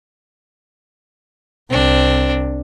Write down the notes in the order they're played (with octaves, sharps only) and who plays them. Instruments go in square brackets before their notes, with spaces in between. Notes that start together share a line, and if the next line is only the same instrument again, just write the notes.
[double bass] C2 [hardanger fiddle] C4 D4